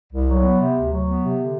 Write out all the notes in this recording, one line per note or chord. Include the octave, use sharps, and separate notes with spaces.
C2
F#3
B3
C3
D2
F#3
B3
C3
D3